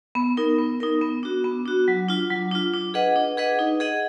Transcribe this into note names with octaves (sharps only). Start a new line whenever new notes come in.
B3
D#4 A#4
B3
D#4 A#4
B3
D4 F#4
B3
D4 F#4
F#3
D4 F4
F#3
D4 F4
D4
G#4 B4 D#5 F#5
D4
G#4 B4 D#5 F#5
D#4
G#4 D#5 F#5